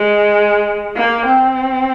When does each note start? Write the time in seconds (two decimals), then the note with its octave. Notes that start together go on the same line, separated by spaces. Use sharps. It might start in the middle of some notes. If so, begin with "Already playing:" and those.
Already playing: G#3
0.96 A#3
1.26 C4